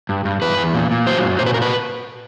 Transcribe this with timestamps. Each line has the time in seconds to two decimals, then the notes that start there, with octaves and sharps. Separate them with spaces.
0.09 G2
0.25 G2
0.42 E2 B4
0.58 E2
0.74 A#2
0.91 A#2
1.07 F#3 C5
1.23 F#2
1.39 A#2 C5
1.46 B4
1.54 A#2 A#4
1.62 B4